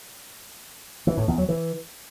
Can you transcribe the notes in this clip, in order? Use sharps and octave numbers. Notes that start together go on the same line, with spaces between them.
E3
A2
E2
F#3
E3